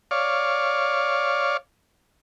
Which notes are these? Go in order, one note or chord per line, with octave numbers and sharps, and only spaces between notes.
C#5 D5 F5